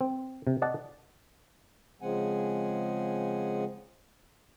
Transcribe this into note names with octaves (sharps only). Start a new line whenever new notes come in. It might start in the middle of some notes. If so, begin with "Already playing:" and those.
C4
C3
D5 D#5 F#5 A5
C#3 F3 G#3 C4 F#5 G#5